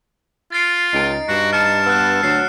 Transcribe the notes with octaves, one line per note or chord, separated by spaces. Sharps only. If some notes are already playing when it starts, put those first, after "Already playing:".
F4 A6 C7 D7
C#2 D#4 C7 D7
G2 F#4 C7 E7
A5 F6 C#7 E7
B3 E6 F#6
D2 F#3 C7